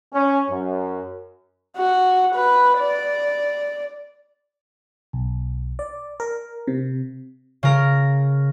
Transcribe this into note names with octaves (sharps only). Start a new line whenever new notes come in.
C#4
F#2
F#4
B4
D5
B1
D5
A#4
C3
C#3 A#4